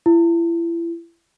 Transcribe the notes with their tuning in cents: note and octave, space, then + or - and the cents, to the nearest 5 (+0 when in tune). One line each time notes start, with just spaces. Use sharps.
E4 +35